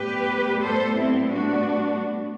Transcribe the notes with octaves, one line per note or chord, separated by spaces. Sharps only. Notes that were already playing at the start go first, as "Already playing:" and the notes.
Already playing: A2 G3 B3 G4 B4
A4 C5
C4 E4
D4 F#4